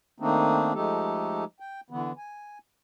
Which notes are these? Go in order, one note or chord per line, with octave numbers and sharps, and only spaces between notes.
D#3 A3 A#3 C4 D4 D#4
F3 G#3 A3 D#4 G4 A4
G5
D3 E3 B3
G#5